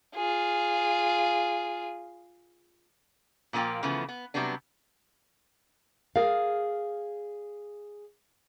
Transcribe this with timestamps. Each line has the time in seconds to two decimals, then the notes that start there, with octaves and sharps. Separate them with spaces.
0.15 F4 G#4
3.53 A#2 F3 A#3 F4 G5
3.83 C#3 E3 F3 A3 B3
4.09 B3
4.34 C3 F#3 G3 B3 D4
6.16 G#4 A#4 D5 F5